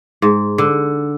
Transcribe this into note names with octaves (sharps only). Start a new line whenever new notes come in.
G#2
D3